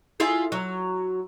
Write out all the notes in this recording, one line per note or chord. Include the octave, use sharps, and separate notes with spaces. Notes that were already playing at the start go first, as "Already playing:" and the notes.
E4 F4 G#4
F#3